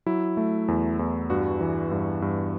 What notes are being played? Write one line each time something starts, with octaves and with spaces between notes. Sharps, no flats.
F#3 E4
A3
E2
E2
G2 F#4
E3
G2
G2